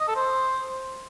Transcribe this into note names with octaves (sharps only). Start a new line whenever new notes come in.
D#5
A4
C5